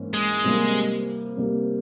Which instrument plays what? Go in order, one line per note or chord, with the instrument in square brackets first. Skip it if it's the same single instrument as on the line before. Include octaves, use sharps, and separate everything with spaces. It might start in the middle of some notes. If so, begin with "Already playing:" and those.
Already playing: [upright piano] G#2 E3 A#3 C#4 E4
[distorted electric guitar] G#3
[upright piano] C3 G3 A#3
C3 G3 A#3